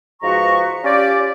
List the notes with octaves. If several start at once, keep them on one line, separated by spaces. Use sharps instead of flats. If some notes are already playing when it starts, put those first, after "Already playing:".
G#2 F3 F#4 B4 A#5 C#6
C#4 F4 G4 D5